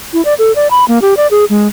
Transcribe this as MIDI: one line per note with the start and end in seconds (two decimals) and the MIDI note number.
0.13 0.24 64
0.25 0.34 74
0.39 0.54 69
0.56 0.68 74
0.71 0.85 83
0.88 0.99 58
1.02 1.14 67
1.17 1.27 74
1.31 1.45 68
1.50 1.67 56